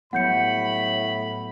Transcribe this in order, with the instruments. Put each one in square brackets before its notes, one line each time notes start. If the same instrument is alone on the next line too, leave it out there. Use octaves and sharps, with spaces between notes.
[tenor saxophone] A2 [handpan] F#3 G3 B3 [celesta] F#5 G6 C#7 [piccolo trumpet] B5